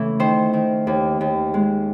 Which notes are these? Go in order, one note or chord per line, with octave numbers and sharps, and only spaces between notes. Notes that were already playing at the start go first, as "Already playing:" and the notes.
Already playing: C#3 E3 A3
D#3 C5
D#3
D#2
D#2
G#3